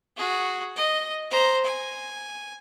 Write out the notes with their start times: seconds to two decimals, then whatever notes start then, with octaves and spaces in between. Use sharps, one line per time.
0.17 F#4 G#4
0.76 D#5
1.31 C5 A#5
1.64 G#5